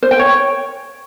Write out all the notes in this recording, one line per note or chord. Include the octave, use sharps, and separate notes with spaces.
C5
G5
C#5